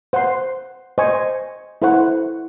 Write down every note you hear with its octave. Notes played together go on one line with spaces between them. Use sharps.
C5 F#5 C6
C5 D#5 G#5 C#6
E4 A4 C5 F#5 C#6